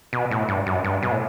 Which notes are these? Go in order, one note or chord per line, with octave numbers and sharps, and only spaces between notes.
B2
A2
G2
F#2
G2
B2
A2